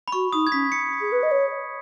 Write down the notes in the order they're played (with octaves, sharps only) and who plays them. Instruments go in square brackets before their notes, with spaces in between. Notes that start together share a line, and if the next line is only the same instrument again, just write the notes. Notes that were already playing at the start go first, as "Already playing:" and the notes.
[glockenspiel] B5
[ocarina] F#4 [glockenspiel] C#6
[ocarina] D#4 [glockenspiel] D#6
[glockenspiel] G#6
[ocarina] C#4 [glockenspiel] B6
[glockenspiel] C#7
[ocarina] G#4
B4
D#5
C#5